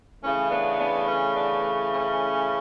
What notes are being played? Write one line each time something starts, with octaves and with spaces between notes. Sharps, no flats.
C#3 E3 A3 C#4
B3 D4
B3 D4
C#4
B3 D4
C#4